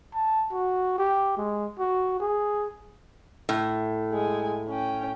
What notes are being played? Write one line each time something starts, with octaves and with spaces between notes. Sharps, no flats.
A5
F#4
G4
G#3
F#4
G#4
A2
G#3 G#5
C#4 G5